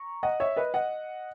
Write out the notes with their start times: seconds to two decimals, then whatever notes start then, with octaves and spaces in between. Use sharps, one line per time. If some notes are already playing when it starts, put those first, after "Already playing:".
Already playing: A#5 C#6
0.23 D#5 F#5
0.40 C#5 E5
0.56 B4 D#5
0.74 D#5 F#5